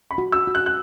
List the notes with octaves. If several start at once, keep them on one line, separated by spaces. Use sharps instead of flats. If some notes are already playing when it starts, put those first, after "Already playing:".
B5
F#4
E6
F#4
F#6
F#6